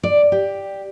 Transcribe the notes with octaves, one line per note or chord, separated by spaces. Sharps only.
D5
G4